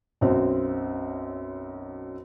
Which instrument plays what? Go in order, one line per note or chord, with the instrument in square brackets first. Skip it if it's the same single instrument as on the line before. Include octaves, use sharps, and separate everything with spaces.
[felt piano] B1 F#2 C4